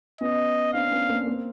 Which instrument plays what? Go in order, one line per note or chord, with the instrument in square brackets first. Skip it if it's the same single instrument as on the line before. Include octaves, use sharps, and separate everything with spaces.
[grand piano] B3 C#4 [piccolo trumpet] D#5
[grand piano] C4 D4 [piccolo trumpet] F5
[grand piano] B3 C#4
A#3 C4
A#3 C4